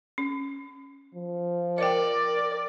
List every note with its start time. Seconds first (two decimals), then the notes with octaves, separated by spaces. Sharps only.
0.18 C#4
1.14 F3
1.78 A#4 D5 D#5 G5